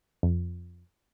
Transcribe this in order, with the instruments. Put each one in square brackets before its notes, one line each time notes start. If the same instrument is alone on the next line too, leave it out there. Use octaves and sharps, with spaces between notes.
[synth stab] F2